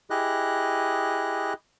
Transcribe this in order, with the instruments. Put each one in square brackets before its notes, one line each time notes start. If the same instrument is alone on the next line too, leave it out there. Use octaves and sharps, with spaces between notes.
[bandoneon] E4 G4 G#4 D#5 F#6